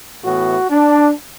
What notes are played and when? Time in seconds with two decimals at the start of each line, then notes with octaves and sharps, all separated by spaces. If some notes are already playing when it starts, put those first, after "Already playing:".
0.23 A2 E3 B3 F#4
0.70 D4